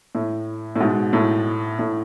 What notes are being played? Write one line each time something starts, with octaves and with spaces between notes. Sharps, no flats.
A2
A2
G#2 B2
A2
A2